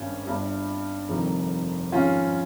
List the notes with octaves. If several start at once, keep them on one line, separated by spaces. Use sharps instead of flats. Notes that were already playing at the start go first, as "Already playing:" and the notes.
Already playing: G#1 G2 G3 C#4
G1 G2 G3
F1 F2 D#3 G3
G#1 G#2 F3 C#4 F4